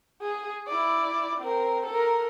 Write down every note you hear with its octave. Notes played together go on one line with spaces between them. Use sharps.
G#4
E4 D5
C4 A#4
A4 A#4